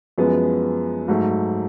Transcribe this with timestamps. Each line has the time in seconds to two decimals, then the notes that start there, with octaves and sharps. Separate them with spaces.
0.18 F#2 F3 G#3 B3
1.08 G#2 F#3 A3